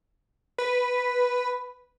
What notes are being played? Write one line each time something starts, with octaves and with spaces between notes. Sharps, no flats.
B4